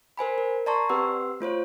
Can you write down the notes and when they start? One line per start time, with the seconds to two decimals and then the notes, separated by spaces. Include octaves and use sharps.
0.17 A#4 C5 G#5 B5
0.38 A#4
0.66 D5 A5 A#5 C6 C#6
0.89 C4 G4 B4 F#5 C6 E6
1.40 A3 F4 C5 C#5